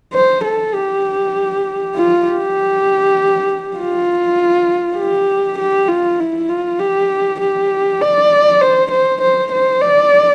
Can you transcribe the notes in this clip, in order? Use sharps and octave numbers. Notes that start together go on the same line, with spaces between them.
C5
A4
G4
F4
G4
F4
G4
G4
F4
E4
F4
G4
G4
D5
C5
C5
C5
C5
D5